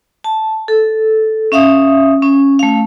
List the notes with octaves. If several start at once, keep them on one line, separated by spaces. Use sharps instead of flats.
A5
A4
C#4 E5 F5 D#6
C#4
A3 F5